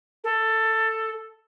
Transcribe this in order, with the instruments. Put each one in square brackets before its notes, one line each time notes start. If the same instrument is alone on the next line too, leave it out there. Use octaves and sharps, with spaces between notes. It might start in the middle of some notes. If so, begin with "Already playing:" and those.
[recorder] A4